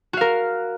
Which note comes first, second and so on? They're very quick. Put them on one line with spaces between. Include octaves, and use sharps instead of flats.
F#4 F5 A#4